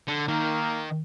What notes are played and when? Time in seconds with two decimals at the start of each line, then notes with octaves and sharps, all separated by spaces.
0.08 D3
0.28 D#3 A#3